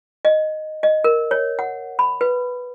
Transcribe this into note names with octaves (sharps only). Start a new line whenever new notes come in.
D#5
D#5
A#4
C#5
F#5
B5
B4